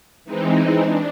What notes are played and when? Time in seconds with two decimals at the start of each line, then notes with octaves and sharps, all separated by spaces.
0.25 E3 G#3 C4 D#4
0.81 D4